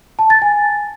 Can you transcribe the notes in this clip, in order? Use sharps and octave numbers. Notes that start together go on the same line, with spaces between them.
A5
A6
G#5